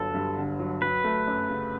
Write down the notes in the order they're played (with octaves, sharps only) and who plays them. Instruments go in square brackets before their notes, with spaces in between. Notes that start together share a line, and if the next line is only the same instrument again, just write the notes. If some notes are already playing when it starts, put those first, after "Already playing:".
Already playing: [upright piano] G1 D3 F#3 [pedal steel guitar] A4
[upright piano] G2
D3
F#3
[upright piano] F#3 [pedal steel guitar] B4
[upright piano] A3
F#2
C#3